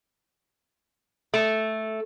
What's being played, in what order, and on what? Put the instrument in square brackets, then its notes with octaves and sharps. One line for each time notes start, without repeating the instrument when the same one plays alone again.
[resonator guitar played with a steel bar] A3